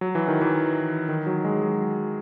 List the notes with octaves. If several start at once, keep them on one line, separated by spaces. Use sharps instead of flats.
F#3
E3
D#3
E3
D#3
F#3
G#3
F#3